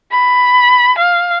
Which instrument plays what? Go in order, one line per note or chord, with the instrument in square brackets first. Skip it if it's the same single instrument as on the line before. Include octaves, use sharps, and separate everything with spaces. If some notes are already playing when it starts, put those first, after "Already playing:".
[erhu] B5
F5